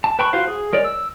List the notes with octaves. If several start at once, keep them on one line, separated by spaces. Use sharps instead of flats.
A5
B4 G5 A5 B5 C#6
F4 F#4 C5 F5
G#4
G#3 A#4 C#5 D5
E6